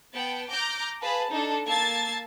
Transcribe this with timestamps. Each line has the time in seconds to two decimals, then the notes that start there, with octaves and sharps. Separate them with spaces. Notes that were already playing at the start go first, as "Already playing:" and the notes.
0.13 B3 G5 A5
0.50 A#5 D6 F6 G6
1.01 G#4 B4 F5 A5
1.32 D4 D#4 A4
1.65 A#3 A5 E6 G#6 A6 C7